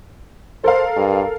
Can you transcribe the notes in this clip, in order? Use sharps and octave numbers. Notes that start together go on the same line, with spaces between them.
A4 A#4 C5 F5
G2